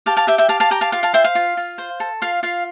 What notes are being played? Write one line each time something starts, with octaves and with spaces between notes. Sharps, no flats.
G4 F5 A5
F5 A5
G4 E5 G5
E5 G5
G4 F5 A5
F5 A5
G4 G5 A#5
F5 A5
F4 F5
F5 A5
C5 E5 G5
F5
F4
F4
C5
A4
F4 F5
F4 F5